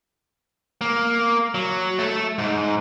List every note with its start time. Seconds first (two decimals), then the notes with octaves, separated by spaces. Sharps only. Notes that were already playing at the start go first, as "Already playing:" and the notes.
0.81 A#3
1.55 F#3
1.99 A3 A4
2.38 G#2